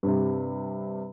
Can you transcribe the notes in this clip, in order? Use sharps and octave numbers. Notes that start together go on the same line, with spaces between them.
G2 C3